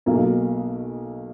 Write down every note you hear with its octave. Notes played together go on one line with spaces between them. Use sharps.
B1 B2 A#3